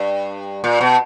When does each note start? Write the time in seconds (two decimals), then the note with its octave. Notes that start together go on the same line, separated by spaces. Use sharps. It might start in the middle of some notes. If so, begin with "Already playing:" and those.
Already playing: G2
0.64 A#2
0.81 B2